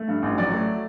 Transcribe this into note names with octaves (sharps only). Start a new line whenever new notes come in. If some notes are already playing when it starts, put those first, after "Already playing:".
Already playing: A3
G2
A1
F#3 D5
A3